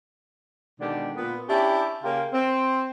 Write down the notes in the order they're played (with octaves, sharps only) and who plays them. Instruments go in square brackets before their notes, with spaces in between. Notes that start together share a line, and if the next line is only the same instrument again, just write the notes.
[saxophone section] B2 D3 D#3 G#3 D4 G4
A#2 B3 B4
C#4 D4 E4 G4
C#3 A#3 C#4 F4 G4 A#4
C4